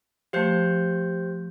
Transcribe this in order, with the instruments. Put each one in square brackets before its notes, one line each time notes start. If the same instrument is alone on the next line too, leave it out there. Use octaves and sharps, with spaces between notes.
[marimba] F3 A3 [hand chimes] G4 C5 G6